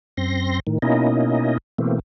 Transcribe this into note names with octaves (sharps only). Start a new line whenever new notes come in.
F#2 C4 C6 A#6
A2 D#3
B2 A#3 C#4 D#4 E4 D#5
B2 E3 A3 A#3 C4